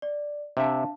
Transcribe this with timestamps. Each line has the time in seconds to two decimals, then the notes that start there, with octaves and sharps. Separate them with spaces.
0.02 D5
0.57 C3 D4 E5 F5 A5